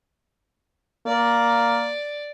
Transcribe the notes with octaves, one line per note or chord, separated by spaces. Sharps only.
A#3 D5